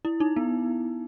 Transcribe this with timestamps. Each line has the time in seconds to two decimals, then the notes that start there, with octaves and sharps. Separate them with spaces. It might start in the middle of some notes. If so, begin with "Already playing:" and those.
0.05 E4
0.20 D#4
0.36 B3